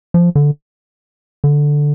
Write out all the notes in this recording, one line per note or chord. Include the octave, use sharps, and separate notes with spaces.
F3
D3
D3